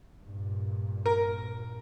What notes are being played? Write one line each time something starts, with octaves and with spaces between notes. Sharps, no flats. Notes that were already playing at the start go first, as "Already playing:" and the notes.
G2 A#2
A#4